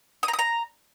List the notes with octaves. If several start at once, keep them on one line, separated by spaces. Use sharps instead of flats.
D#6
A#5
D#6
A#5